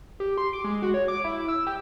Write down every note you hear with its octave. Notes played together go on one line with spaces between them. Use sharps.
G4
C6
D6
G#3
F#4
C#5
D6
E4
E6
G4